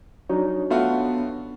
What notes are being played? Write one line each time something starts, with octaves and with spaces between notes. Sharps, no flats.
F#3 D4 D#4 C#5
A3 B3 F4 F#4